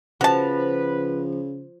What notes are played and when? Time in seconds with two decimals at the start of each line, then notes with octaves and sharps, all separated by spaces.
0.21 C#3 F3 F#4 B4 A5